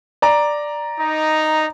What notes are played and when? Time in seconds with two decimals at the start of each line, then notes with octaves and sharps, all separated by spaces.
0.22 D5 A#5
0.99 D#4